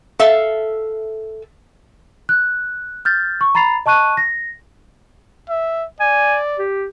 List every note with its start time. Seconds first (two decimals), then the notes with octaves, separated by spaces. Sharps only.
0.19 A4 E5 F5
2.29 F#6
3.05 F6 G6 A6
3.41 C#6
3.55 A#5 B5 A6 C7 F7
3.86 D#5 A5 C#6 F#6 D#7
4.17 A#6
5.49 E5
6.00 D5 G#5
6.59 G4